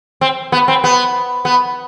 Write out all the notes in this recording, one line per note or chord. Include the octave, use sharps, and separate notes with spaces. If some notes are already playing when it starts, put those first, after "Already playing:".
C4
B3
C4
B3
B3